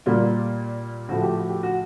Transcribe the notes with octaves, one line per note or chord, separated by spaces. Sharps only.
A#2 G3 A#3 F4
A2 F3 A3 F#4
G4
F#4
G4
F#4